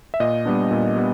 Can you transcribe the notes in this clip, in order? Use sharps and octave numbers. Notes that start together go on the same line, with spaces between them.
E5
A#2 D#5
G3 B3 D4
A#2
G3 B3